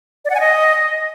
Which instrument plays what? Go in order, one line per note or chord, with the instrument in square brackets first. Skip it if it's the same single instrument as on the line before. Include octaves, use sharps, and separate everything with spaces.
[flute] D5
F#5
G#5
D#5